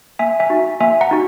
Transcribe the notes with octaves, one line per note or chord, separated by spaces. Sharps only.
A#3 E5 G#5
E5 G#5
D#4 F#4
A#3 E5 G#5
F#5 A#5
D#4 F#4